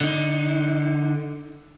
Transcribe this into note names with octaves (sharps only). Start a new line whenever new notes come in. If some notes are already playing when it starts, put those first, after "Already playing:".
D3 D#4